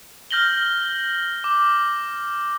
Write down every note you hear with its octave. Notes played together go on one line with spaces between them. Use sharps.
F6 G6 A#6 F#7 G7
D6